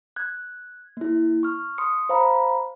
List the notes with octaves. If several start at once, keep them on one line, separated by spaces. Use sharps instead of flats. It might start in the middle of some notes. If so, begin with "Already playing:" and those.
F#6 G#6
A#3 E4
C#6 F6
C6 D#6 C#7
C5 F5 A#5 B5